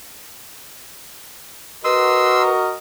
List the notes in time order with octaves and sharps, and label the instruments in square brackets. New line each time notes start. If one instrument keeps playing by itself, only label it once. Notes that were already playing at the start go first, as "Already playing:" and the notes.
[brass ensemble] F#4 A#4 [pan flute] B4 [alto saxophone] D#5 [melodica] C6 E6